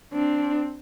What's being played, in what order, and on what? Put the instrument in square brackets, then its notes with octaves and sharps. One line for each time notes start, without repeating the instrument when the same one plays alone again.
[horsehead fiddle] C4 D4